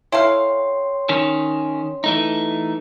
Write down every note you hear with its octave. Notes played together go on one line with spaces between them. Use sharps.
E4 A4 C#5 F5 G5 C6
D#3 C#4
E3 A3 D#4